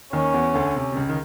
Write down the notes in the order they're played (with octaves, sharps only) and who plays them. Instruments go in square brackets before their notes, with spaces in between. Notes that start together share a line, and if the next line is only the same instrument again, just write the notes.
[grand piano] D#2 D#3 [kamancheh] C#4
[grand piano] E2 E3
D2 D3
C3
C3
C#2 C#3
D#3